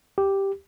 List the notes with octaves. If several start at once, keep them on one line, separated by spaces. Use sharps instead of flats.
G4